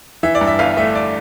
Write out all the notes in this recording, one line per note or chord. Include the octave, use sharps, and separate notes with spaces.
E3 E5
D5
G2
E5
G1 F5
A3 E5
D5